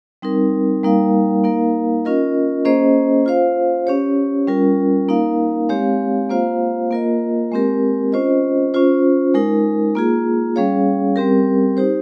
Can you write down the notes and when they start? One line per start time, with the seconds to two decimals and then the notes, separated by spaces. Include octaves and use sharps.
0.22 G3 C4 D#4 A#4
0.83 G3 A#3 D#4 A#4 F5
1.44 A#3 D#4 A#4 F5
2.05 C#4 F4 A#4 D#5
2.65 A#3 C#4 G#4 C5 D#5
3.26 F4 C5 F5
3.87 C#4 G4 C#5
4.47 G3 C#4 F4 A#4
5.08 A#3 D#4 A#4 F5
5.69 G#3 C4 G4 C#5 F5
6.30 A#3 F4 C5 F5
6.91 A#3 F4 A#4 D#5
7.52 G#3 C4 G4 A#4
8.12 C#4 F4 C5 D#5
8.74 C#4 F4 C5
9.34 G#3 D#4 A#4
9.95 A#3 F4 G#4
10.56 G3 C#4 G#4 C#5 F5
11.16 G3 C4 G4 A#4
11.77 D#4 G4 C5